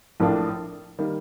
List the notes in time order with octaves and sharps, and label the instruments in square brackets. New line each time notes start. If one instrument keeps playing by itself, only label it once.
[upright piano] A#1 A2 F3 A#3 D4
D#3 G3 A#3